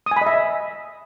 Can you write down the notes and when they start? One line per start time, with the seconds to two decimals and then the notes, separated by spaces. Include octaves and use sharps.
0.06 D#6
0.11 G#5
0.16 B5
0.21 D#5
0.26 E5